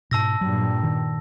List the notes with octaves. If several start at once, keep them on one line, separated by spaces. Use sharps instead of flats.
G#2 B2 A5 E6 A#6
G2 A#2 F#3
D#3